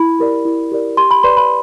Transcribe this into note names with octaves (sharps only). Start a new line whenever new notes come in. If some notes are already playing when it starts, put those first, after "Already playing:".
Already playing: E4 B5
G4 A#4 D5
E4
G4 A#4 D5
G4 C6
B5
B4 D5 C6
B5